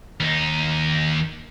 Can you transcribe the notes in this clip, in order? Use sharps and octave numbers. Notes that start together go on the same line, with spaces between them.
D#2 D#4